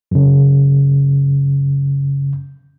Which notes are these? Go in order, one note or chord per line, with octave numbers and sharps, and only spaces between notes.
F#2 C#3